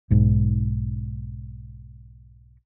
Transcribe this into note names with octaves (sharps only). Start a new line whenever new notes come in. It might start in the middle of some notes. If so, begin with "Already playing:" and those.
B1 G#2